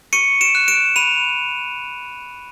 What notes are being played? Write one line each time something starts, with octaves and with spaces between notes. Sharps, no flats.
C#6 C#7 D#7
D7 E7
F#6
D7 E7
B5 D#7 F7